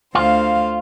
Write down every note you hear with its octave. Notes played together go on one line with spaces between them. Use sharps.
D2 F4 C5 F5